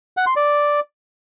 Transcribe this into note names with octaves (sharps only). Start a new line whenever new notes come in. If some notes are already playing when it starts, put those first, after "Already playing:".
F#5
C6
D5